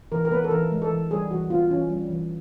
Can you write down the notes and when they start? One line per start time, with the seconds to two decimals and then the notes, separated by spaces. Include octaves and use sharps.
0.12 E3 A#4
0.25 A#4
0.31 B3 B4
0.44 A4
0.51 E3 A#4
0.72 G#3
0.82 A4
0.90 E3
1.11 G3 G#4
1.31 E3 F#4
1.50 B3 F4
1.71 E3 C#4
1.90 G3
2.10 E3